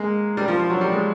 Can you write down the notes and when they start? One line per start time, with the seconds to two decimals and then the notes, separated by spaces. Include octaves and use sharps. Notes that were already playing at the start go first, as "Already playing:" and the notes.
Already playing: G#3 A#3
0.37 G3
0.48 F3
0.59 F3
0.70 F#3
0.81 G3
0.92 G#3